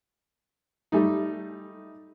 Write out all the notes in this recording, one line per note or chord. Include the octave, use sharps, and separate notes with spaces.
G3 A3 D#4